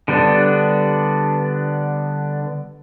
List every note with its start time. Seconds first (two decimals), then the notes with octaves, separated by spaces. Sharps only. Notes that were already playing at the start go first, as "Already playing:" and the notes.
0.08 D3 G3 B3 D4